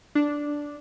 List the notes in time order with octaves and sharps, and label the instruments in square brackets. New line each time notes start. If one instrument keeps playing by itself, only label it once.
[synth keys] D4